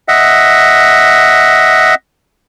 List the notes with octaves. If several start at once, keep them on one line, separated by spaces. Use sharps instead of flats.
D#5 E5 F#5